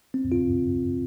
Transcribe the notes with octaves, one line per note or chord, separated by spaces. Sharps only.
C4
F4